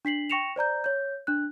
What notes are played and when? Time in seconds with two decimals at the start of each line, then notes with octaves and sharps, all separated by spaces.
0.05 D4 B6 C7 F#7
0.30 G5 C#6 A#6 C#7 E7 F7
0.56 C5 D5 A#5 G6
0.84 C#5 G6
1.27 D4 F#6